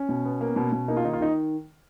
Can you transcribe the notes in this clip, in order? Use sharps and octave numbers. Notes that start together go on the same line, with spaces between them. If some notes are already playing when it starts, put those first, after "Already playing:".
Already playing: C#4
B2
B3
A#3
B2
B2
A#3 D#4
F4
D#3 D#4
F4
D#3 D#4